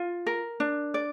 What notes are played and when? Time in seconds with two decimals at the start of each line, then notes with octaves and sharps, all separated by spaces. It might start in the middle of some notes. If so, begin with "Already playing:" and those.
Already playing: F4
0.26 A#4
0.60 D4
0.94 D5